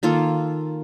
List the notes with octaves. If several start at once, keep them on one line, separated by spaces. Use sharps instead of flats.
D#3 A#3 F4 A4